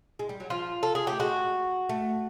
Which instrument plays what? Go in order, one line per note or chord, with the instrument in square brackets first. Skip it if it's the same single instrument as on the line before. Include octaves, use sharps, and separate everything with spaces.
[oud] G#3
G3
F#3
[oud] F3 [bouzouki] F4
[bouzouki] A4
G#4
[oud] A3 [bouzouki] G4
[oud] G#3 [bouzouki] F#4
[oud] A3